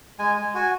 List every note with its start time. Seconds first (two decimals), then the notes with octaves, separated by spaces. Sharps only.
0.19 G#3 G#5
0.37 G#3 G#5
0.54 F#4 G#5